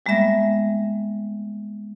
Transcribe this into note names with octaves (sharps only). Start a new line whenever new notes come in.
G3 G#3 A#3 B3 E5 A#6